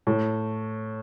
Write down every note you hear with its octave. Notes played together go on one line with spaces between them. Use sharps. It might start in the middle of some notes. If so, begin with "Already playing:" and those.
A2